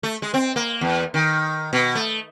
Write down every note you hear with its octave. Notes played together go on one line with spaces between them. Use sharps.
A3
G#3
C4
A#3
E2
D#3
B2
A3